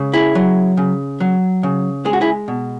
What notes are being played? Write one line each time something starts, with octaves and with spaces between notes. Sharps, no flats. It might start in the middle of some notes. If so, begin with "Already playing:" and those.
Already playing: C#3 G#3
E4 G#4
F#3
C#3
F#3
C#3
G#3 G#4
F#4
E4 G#4
B2